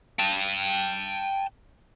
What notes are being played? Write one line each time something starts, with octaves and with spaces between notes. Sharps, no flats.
G5 A5